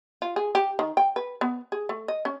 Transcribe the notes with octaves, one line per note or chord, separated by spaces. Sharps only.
F4
G#4
G4
D#3
G5
B4
B3
G#4
A3
D#5
C#4